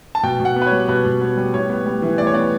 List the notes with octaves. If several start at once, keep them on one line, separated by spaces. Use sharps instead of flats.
A5
B2 G5
B2
F#5
B3
B4
C#5
G3
B2 B4
B2
B3
G3
A2 C#5
B3
G3
E3
A2 D5
C#5
B3 D5